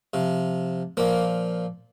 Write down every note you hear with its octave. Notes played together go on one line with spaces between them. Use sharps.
C3 F3
A#2 F3 A#3